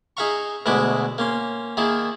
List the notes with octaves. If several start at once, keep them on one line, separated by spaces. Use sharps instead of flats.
D#4 G#4 E5 F5 A#5 C#6
D2 B2 G#3 E4 E5 D6
A#3 C#4 C6
D#3 A#3 E4 G#4